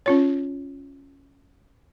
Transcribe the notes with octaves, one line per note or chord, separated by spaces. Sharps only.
C#4 F4 C#5